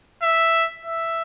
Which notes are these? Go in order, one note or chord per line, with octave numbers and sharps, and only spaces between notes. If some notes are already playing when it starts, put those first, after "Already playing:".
E5
E5